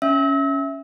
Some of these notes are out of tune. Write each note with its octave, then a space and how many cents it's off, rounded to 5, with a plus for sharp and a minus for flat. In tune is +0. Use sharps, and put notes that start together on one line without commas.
C#4 +5 E5 +0 E6 -35